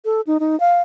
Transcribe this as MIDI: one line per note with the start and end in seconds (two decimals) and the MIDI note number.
0.05 0.21 69
0.27 0.38 63
0.40 0.58 63
0.60 0.82 77